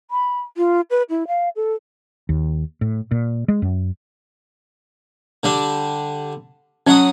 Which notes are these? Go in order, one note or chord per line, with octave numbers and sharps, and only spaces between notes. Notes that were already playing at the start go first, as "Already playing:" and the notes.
B5
F4
B4
E4
F5
A4
D#2
A2
A#2
G#3
F#2
D3 G3 D4
F#3 C#4 F#5 D#6